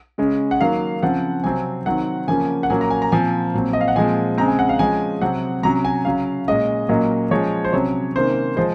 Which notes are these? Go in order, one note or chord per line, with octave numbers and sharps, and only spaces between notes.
C#3 G#3 C#4
F#5
D#3 F#3 A#3 F5
C#3 F3 C4 F#5
C3 F#3 C4 G#5
D#3 F#3 C4 F#5
C#3 F3 A#3 C#4 G#5
F#5
A#2 F#3 A#3 C#4 G#5
A#5
G#5
A#5
A#2 F3 C4 G#5
A#2 F#3 C4
D#5
F5
F#5
A#2 F3 G#3 C4 G#5
C#3 G#3 C4 A#5
G#5
F#5
F5
F3 G#3 C#4 G#5
C3 F#3 C4 F#5
C3 F#3 C#4 A#5
G#5
C#3 F#3 C#4 F5
A#2 G#3 C#4 D#5
A#2 F#3 A#3 C#4 D#5
F3 G#3 C#4 C#5
C5
C3 F#3 C#4 C#5
C3 D#3 A#3 C#4 C5
F3 G#3 C5